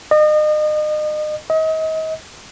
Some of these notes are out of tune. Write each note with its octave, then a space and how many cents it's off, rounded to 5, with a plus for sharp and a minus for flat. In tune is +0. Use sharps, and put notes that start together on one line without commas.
D#5 -35
D#5 +35